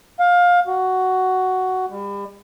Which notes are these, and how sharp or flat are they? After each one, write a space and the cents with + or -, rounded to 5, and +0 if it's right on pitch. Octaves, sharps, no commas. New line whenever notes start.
F5 +20
F#4 +10
G3 +35